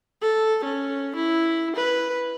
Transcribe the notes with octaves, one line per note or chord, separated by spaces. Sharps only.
A4
C#4
E4
B4